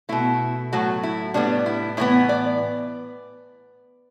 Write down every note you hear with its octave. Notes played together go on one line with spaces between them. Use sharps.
B2 A3 E4
A2 F#3 A3 F#4
E4
A2 G3 B3 D4
E4
A2 E3 B3 E4
D5